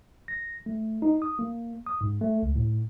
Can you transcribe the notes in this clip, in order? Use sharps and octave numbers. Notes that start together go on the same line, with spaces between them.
A#6
A3
D#4
D#6
A#3
D#6
G#2
A3
C#2
A2